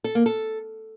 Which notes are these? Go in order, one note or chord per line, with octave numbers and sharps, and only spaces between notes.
A4
A#3
A4